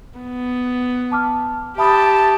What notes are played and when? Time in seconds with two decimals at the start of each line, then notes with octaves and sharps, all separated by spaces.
0.19 B3
1.12 A5 D6 F6
1.78 G4 E5 A5 B5 D#6